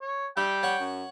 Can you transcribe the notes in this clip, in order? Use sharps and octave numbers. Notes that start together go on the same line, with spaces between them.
C#5
G3 E5 G5
C#5 F#5 C#6
F#2